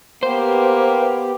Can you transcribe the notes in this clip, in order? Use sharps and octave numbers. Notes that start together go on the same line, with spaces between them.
A#3 B3 G4 C5